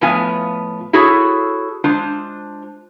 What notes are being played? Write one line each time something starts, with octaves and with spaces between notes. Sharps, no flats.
A2 F3 B3 F4 G#5
E4 F#4 G#4 A4 C#5
G#3 D4 F4 C5